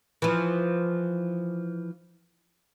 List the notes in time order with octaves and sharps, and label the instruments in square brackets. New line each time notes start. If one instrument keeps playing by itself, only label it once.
[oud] E3 F3